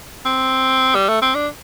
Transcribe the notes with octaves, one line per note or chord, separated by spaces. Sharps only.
C4
G3
A3
C4
D4